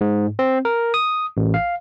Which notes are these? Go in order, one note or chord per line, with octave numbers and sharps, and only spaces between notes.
G#2
C4
A#4
D#6
A1
F5